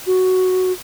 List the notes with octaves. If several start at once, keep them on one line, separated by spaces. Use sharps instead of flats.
F#4